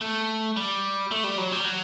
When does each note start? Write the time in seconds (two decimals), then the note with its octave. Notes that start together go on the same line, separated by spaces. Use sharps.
0.01 A3
0.57 G3
1.11 A3
1.24 G3
1.38 F#3
1.52 G3
1.65 F#3